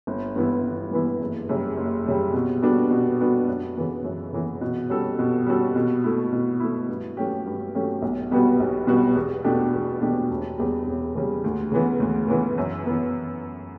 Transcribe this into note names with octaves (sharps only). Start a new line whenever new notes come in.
G1
G2 E3 B3 E4
G1
G2 E3 B3 E4
F#1
F#2 C#3 G3
F#1
F#2 C#3 G3
B2
G3 B3 D4 F#4
B2
G3 B3 D4 F#4
F#2
C#3 E3 B3
F#2
C#3 E3 B3
B2
G3 C#4 F#4 A4
B2
G3 C#4 F#4 A4
B2
A3 E4
B2
A3 E4
G2
F#3 A3 C#4 G4
G2
F#3 A3 C#4 G4
B1
B2 G3 B3 F#4
B1
B2 G3 B3 F#4
E2
B2 A3 D4 G4
E2
B2 A3 D4 G4
E1
E2 C#3 G3
E1
E2 C#3 G3
D2
C#3 E3 B3
D2
C#3 E3 B3
F#2
E3 B3